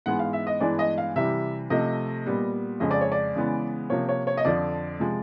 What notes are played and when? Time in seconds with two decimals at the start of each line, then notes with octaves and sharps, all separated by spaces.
0.06 G#2 E3 G#3 B3 F#5
0.19 F5
0.33 E5
0.47 D#5
0.60 G2 E3 G#3 B3 D5
0.79 D#5
0.98 F5
1.16 C3 E3 G3 E5
1.70 C3 F3 A3 D#5
2.26 A#2 G3 B3
2.80 F2 C#3 F3 G#3 D#5
2.91 D5
3.01 C#5
3.12 D5
3.35 C#3 E3 G#3 B3
3.90 C3 F3 A#3 C#5
4.09 C#5
4.27 C#5
4.37 D#5
4.45 F2 D3 F3 D5
5.00 C3 F3 G#3